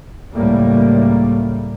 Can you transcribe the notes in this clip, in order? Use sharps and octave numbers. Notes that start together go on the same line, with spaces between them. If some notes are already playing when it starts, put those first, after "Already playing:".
C#2 A2 G3 A#3